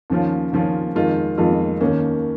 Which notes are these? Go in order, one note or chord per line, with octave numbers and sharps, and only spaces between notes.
D#2 C#3 F3 C#4 F4
D#2 C#3 F3 C#4 F4
F2 D#3 G#3 F4
F2 D#3 G#3 F4
D#2 D#3 A#3 C#4